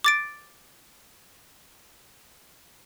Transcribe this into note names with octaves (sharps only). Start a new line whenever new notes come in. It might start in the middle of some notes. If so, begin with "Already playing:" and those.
D6 A6 D7